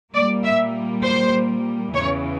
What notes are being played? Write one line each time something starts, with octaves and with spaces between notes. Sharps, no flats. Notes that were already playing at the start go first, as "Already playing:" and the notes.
A#2 G3 A#3 D5
E5
C5
E2 C#3 E3 C#5